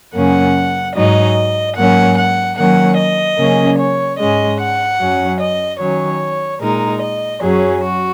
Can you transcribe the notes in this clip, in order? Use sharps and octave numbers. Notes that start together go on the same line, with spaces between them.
F#2 C#3 A#3 C#4 F#5
G#2 F#3 D#4 D#5
G#2 F#3 A#3 C#4 F#5
F#5
D#3 F#3 A#3 C#4 F#5
D#5
C#3 F#3 A#3 C#4
C#5
G#2 G#3 C#4 D#5
F#5
F#2 F#3 C#4
D#5
D#3 F#3 C#4 C#5
A#2 G#3 D#4 A#4
D#5
F#2 F#3 C#4 G#4
F#4